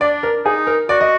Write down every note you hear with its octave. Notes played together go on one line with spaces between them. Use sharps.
D4 D5
A#4
D#4 G#4
A#4
F#4 D5
D#5